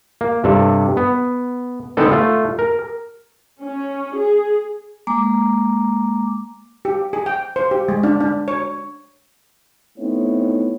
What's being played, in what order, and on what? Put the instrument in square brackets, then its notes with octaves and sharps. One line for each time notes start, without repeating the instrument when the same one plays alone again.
[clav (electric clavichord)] A#3
G2 C3 A4
B3
D3 G#3 B3 C4 D#4 A4
A3 F4
A#4
[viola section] C#4
G#4
[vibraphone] G#3 A#3 A#5 D6
[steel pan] G4
G#4
G5
C5
G4
G#3
D4
D4
C#5
[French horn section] A3 B3 C4 D#4 E4 C#5